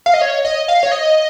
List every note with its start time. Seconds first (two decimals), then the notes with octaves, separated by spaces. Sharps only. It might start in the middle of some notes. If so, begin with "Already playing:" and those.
0.06 F5
0.14 D#5
0.21 C#5
0.45 D#5
0.68 F5
0.83 C#5
0.92 D#5